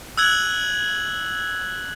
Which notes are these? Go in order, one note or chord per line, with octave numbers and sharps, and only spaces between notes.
E6 F#6 G#6 F#7